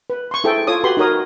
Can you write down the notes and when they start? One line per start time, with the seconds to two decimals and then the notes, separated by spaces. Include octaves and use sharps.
0.10 B4
0.31 C6 C#6
0.44 E4 G#4 A4 C5 G5
0.67 F4 A4 C#5 D#6
0.84 F#4 G4 B4 B5 C6
0.97 D#4 F#4 A#4 C#5 D#6